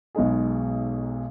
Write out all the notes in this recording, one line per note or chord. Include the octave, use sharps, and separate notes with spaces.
B1 B2 G#3 D#4 G#4